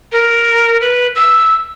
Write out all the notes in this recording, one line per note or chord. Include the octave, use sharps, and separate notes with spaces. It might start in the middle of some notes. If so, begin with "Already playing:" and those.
A#4
B4
E6